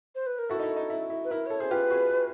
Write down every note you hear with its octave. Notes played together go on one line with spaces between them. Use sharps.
C5
B4
A#4
E4 F#4 A4
D#4
E4
D#4
E4
E4
B4
E4 A#4
A4 C#5
G#4 C5
F4 G4 B4
F#4 G#4